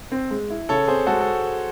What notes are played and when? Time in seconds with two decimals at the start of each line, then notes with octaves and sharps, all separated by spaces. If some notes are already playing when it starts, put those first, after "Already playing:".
0.12 C4
0.31 G#3
0.50 E4
0.69 C#3 A4 C#5
0.88 C4 G#4 C5
1.07 G#3 F#4 A4
1.21 A4